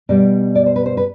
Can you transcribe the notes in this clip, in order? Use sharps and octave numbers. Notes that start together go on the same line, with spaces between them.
B2 G3 D5
D5
C5
B4
C5
B4